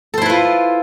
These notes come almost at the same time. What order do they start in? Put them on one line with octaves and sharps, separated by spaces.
A4 C5 E4 B4 F4